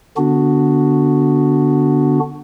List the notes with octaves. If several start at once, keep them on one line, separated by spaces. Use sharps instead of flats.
D3 B3 D4 F#4